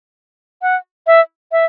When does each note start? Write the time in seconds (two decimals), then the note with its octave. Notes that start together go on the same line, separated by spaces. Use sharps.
0.62 F#5
1.07 E5
1.52 E5